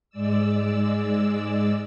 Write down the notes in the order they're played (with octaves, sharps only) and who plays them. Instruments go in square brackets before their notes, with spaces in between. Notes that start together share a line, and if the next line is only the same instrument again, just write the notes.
[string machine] G#2 G#3 D5 E6